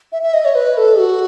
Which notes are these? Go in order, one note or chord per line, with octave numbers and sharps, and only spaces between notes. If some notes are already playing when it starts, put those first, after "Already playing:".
E5
E5
D#5
C#5
B4
A4
F#4